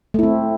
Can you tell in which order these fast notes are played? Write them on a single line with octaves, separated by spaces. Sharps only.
A3 E4 C4